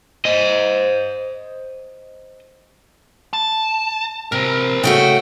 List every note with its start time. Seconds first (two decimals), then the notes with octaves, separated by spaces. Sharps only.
0.25 C5 D#5
3.33 A5
4.32 C3 A#4 C5
4.84 C#3 A3 F#4 G5